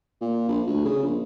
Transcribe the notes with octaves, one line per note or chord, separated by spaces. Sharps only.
A#2
A#1
D2
C#3
A#1